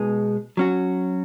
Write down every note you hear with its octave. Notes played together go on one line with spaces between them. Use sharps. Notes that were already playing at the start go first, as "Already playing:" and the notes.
Already playing: B2 G#3 B3 D#4 G#4
F#3 C#4 F#4